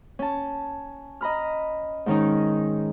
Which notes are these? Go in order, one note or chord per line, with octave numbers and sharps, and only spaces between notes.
C#4 A5
D#5 A#5 B5 F6
G#2 D#3 C#4 D#4